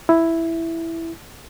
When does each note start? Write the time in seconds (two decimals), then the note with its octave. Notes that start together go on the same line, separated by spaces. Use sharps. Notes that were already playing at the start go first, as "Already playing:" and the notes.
0.09 E4